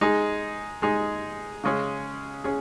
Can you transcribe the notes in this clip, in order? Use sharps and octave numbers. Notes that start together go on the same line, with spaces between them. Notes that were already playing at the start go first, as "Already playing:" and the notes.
G#3 D#4 G#4
G#3 D#4 G#4
C#3 G#3 C#4 G#4
C#4 G#4